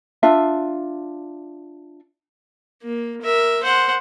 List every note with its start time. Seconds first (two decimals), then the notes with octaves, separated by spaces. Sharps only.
0.23 D4 F4 E5
2.82 A#3
3.22 A#4 E5
3.63 C5 F#5